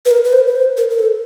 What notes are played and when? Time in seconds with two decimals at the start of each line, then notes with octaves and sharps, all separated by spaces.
0.06 B4
0.11 A#4
0.24 B4
0.33 C5
0.48 B4
0.56 C5
0.77 A#4
0.90 A#4
0.99 A4